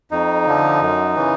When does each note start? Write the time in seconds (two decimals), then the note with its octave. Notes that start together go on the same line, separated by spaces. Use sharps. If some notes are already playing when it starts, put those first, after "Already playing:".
0.11 F2 D#4
0.46 D3 F3
0.81 F#2
1.15 C#3 E3